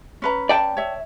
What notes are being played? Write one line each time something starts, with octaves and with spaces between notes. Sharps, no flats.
C#4 B4 A#5
D5 G5 A5
C#5 E5